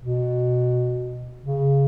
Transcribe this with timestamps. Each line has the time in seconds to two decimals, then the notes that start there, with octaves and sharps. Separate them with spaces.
0.02 B2
1.44 C#3